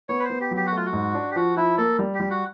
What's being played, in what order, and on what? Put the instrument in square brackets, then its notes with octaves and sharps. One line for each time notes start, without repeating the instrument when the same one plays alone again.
[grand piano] B3 [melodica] C#5
[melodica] B4
C5
[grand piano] B3
[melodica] G4
[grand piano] F#3
[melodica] G4
F#4
[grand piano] A3 [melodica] F4
[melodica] F#4
[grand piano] G#2
D4
[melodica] G4
[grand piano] F3 [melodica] F#4
[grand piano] F3 [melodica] E4
[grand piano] A#3 [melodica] A4
[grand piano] G3
[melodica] G4
[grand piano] G3
[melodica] F#4